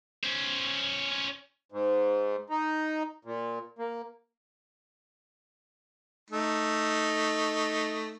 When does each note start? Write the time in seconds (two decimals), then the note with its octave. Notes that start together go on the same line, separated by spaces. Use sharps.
0.23 C#4 C5
1.72 G#2
2.50 D#4
3.25 A#2
3.79 A#3
6.30 A3 D#4